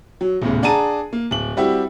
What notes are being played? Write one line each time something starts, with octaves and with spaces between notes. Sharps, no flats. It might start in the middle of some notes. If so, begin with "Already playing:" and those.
F#3
D#1 E2 A2 C#3
D4 G#4 F#5 A5 A#5 D#7
A#3
D1 F#7
G3 C4 E4 F#4 G4 E5